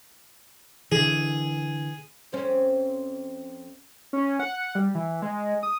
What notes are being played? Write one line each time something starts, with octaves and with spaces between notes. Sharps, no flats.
D3 E3 G#4
F2 C4 C#4
C#4
F#5
G3
E3
G#3
D#6